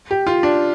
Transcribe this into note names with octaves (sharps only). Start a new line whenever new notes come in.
G4
F4
D4